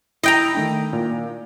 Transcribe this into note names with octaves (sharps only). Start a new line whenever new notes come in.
E4 D#5 G5 A#5
D#3 A3 D4
A#2